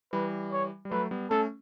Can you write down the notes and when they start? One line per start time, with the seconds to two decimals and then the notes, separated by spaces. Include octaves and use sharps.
0.13 E3 G3 B4
0.52 C#5
0.85 G3
0.91 F#3 A3 B4
1.11 G3 B3
1.30 A3 C#4 A4